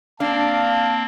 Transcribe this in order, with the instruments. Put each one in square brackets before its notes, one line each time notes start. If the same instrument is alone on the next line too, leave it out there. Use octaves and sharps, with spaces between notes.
[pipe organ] A#3 C4 [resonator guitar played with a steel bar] D4 [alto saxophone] F5 [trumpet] A5